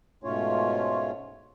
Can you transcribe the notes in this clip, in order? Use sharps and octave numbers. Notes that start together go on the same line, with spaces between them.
G#2 B2 A3 C#4 F4 C#5